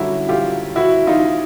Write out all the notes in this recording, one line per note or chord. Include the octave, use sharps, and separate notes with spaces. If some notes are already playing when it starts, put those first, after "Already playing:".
Already playing: F#2 D3 G3 E4 F#4
F4 G4
E4 F#4
D#4 F4